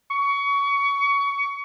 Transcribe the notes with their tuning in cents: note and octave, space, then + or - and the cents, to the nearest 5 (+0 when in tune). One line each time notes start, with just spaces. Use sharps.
C#6 +25